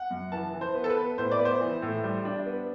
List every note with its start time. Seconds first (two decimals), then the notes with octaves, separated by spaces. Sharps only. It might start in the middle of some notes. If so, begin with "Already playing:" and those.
Already playing: F#5
0.10 F#2
0.32 E3 A5
0.54 E3
0.61 C5
0.75 B3
0.84 A4
0.89 B4
0.97 B3
1.18 A2 C5
1.31 D5
1.39 B3
1.45 C5
1.61 E3
1.82 A2
2.04 G3
2.25 D4
2.46 B3